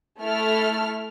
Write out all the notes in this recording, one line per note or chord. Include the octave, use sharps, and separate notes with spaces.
A3 E4 A4 F6